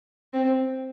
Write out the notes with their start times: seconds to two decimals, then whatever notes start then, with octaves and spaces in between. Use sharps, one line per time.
0.33 C4